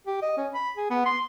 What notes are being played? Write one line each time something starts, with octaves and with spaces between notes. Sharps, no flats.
G4
D#5
C#4
B5
G#4
B3
C6